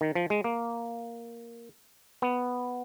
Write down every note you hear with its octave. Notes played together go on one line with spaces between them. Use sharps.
D#3
F3
G#3
A#3
B3